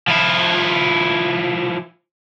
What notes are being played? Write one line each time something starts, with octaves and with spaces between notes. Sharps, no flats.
F3 E4